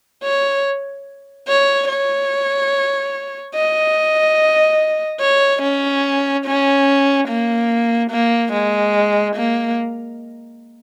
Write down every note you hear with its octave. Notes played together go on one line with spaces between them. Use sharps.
C#5
C#5
C#5
D#5
C#5
C#4
C#4
A#3
A#3
G#3
A#3